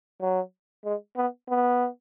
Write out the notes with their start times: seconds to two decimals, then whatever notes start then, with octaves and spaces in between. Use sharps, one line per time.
0.21 F#3
0.85 G#3
1.17 B3
1.49 B3